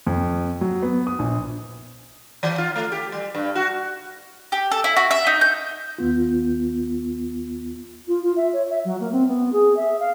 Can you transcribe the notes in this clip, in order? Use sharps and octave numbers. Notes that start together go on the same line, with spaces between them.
F2
F#3
B3
D#6
A#1
E3
F4
A3
G4
G3
G2
F#4
G4
A4
E4
F#4
E5
D#4
G6
D#2 B3 F4
F4
F4
E5
C#5
E5
F#3
A#3
C4
B3
G#4
E5
F5